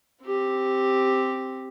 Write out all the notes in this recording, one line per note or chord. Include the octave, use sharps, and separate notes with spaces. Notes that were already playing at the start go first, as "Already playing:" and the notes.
C4 G4